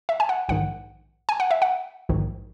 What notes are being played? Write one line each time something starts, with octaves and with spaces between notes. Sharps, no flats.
E5
G#5
F#5
A#1 G#2 D#3 F#5
G#5
F#5
E5
F#5
A#1 G#2 D#3